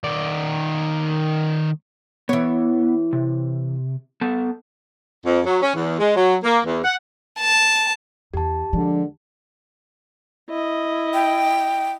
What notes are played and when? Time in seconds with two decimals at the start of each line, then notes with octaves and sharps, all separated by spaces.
0.04 D#3 D5
2.29 E3 B3 C#5
3.13 C3
4.21 B3 A4 A5
5.25 F2
5.46 F#3
5.62 C#4
5.75 E2
5.99 G#3
6.17 F#3
6.43 A#3
6.65 E2
6.84 F#5
7.40 A5
8.34 E2 G4 A5
8.73 D3 F3 G#3 D4
10.50 E4 D#5
11.14 G5